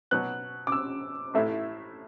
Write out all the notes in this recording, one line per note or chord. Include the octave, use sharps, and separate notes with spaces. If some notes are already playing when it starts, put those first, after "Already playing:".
B2 F#3 B3 F#6
D6
E6
A1 A2 A3 E4 E5